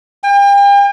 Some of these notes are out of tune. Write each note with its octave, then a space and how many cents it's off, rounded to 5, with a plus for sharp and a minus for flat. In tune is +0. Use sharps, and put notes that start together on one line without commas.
G5 +40